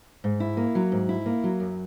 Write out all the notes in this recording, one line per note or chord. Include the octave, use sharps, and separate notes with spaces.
G#2
E4
A#3
F#3
G#2
E4
A#3
F#3
F#2